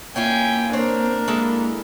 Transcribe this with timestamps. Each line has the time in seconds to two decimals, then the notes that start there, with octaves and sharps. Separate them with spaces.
0.16 A#3 C#4 E4 F4 G5 G#5
0.73 C4 D4 A#4 C5 C#5
1.28 G#3 A#3 E4 A4